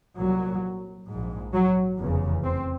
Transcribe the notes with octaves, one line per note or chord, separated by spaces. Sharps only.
C2 A#2 F#3
A#1 G#2
F#3
F1 E2 C#3
C4